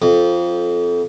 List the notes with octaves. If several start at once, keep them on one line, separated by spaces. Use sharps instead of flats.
F2